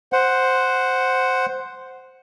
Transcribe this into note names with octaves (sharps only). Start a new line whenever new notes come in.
C5 F#5